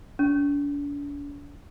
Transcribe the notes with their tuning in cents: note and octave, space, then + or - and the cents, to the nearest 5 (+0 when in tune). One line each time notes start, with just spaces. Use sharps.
D4 -40